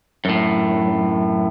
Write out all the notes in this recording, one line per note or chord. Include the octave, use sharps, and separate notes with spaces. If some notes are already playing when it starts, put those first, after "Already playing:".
F#2 A2